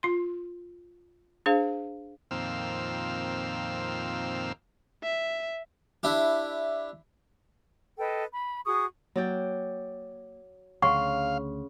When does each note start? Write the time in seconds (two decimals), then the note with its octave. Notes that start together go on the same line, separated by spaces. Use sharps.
0.03 F4 C6
1.46 D4 G#4 C5 F5
2.31 F2 A#2 D#3 C4 F5 E6
5.04 E5
6.03 D4 E4 G4
7.99 A4 B4 D#5 G5
8.31 B5
8.65 F#4 G#4 C#6 D#6
9.16 F#3 A#3 D5 G5
10.82 D2 C#3 F5 F#5 C6 C#6